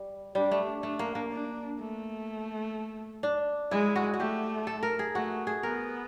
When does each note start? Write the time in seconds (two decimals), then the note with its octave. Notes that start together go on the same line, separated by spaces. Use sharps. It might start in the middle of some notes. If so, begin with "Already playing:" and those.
Already playing: G3
0.35 G3 D4
0.51 A3
0.83 A3 D4
0.99 A#3
1.15 A#3
1.31 D4
1.79 A3
3.23 D4
3.71 G#3 E4
3.96 F#4
4.14 F#4
4.19 A3 G4
4.67 A4
4.83 A#4
4.99 G#4
5.15 A3 F#4
5.47 G#4
5.63 B3 A#4